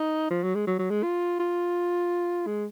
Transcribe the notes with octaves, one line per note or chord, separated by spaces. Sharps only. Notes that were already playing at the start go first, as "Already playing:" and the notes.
Already playing: D#4
F3
F#3
G#3
F#3
F#3
G#3
F4
F4
G#3